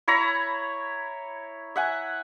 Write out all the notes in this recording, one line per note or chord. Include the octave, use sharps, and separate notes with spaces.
E4 C#5 A#5 B5
E5 F#5 G#5